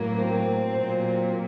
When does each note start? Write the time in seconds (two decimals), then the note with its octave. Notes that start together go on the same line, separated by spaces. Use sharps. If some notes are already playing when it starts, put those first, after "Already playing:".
Already playing: A2 F#3 A#3
0.17 C4
0.73 A#2 F#3 A#3